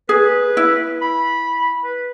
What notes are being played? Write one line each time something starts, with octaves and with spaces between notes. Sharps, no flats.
G#4 B4
E4
B5
B4